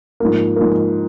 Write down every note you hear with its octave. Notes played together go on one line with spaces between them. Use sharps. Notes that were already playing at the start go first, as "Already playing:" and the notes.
G#2 F3 A#3
G#2 F3 A#3